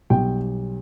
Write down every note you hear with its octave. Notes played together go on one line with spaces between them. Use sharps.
B1 B2 G3 G5